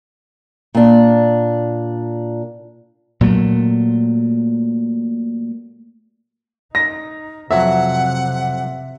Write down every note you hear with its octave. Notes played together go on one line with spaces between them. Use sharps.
A#2 D4
A#2 F#3 A3
D#4 A#6
F2 C3 F#3 E5 F#5